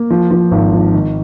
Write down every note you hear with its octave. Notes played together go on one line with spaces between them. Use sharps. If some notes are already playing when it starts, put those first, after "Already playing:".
Already playing: A#3
F3
F3
G#1
F3
D#3